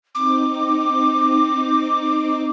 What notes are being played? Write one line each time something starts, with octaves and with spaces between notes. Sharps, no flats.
C4 D#4 D6